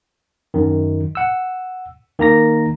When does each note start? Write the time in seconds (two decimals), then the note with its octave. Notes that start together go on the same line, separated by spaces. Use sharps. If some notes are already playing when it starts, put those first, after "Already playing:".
0.54 F#2 D#3
1.15 F#5 E6
2.19 D#3 A#3 A#5 A#6